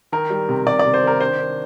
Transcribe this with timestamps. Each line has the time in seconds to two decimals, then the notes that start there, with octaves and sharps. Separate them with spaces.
0.12 D#3 A#4
0.30 G3
0.49 C3
0.66 C3 D5
0.79 D5
0.85 C3
0.94 C5
1.03 D#3 A#4
1.20 D4 C5
1.39 D4